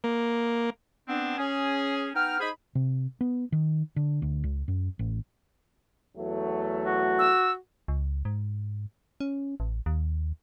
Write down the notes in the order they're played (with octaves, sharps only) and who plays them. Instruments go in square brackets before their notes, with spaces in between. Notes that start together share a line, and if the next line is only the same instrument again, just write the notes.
[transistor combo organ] A#3
[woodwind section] B3 C4 D4
C#4 G#4
B3 D#4 G5 F6
D#4 G#4 C5 B5
[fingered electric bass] C3
B3
D#3
D3
D2
C#2
F#2
A1
[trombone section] E2 F#3 A3
[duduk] F#4
[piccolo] E6
[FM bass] C#2
G#2
C#4
A1
D#2